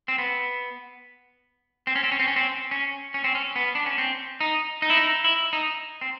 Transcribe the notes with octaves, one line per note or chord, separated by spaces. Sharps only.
C4
B3
C4
C#4
C4
C#4
C4
C#4
C4
C#4
C#4
C4
C#4
B3
D4
C#4
C4
D#4
D#4
E4
D#4
E4
D#4
C4